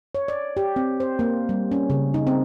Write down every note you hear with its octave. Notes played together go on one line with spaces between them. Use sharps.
C#5
D5
G4
C4
C5
A#3
G3
C#4
C#3
D#4
C4